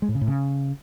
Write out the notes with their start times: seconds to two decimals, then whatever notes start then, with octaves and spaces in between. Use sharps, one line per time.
0.02 G#3
0.09 A2
0.15 C#3
0.21 A2
0.28 C#3